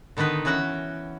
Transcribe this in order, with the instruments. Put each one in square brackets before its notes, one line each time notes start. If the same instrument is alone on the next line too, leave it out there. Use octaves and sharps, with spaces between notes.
[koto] D3 D#3 B3 D#4 B4
E3 C#4 F#4 F#5 G5